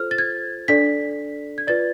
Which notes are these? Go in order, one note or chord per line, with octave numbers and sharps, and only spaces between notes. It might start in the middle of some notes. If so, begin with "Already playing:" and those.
Already playing: F4 A4 C5 F6
A6
G#6
D4 A4 D5 B6
G#6
F4 B4 D5 A6